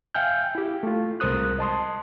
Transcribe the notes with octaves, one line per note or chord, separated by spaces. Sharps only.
E5 F5 G5 G#5 F6 G6
E4 G4
A3 F4
C2 G#3 A#4 C5 D#6 F#6
D#5 A5 C6 D#6